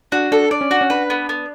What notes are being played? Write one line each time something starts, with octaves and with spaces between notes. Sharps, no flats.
D4 F#4
D4 A4
D4 D5
C#4
D4 F#4
C#4
D4 B4
B3
B3